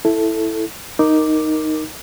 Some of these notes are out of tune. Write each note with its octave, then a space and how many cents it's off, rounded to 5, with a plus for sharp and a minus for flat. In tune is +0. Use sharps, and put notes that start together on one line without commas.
E4 +0 A4 +0
D#4 +0 A#4 +0 D6 +0